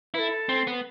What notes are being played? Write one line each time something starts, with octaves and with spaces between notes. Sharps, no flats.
E4 A4 B4
C4
B3